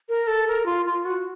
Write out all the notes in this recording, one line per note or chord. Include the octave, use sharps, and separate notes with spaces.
A#4
A4
A#4
F4
F4
F#4